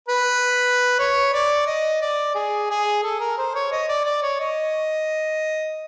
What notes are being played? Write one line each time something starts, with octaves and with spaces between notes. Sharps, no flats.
B4
C#5
D5
D#5
D5
G#4
G#4
A4
A#4
C5
C#5
D#5
D5
D5
C#5
D#5